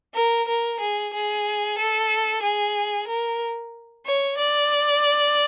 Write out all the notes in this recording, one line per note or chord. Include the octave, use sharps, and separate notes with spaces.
A#4
A#4
G#4
G#4
A4
G#4
A#4
C#5
D5